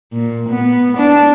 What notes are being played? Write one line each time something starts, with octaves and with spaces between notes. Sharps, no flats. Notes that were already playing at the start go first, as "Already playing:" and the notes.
A#2
B3
D4